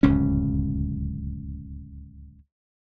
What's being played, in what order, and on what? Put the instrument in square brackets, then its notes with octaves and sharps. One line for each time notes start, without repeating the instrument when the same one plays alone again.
[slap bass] D1 C#2 F#2 C#4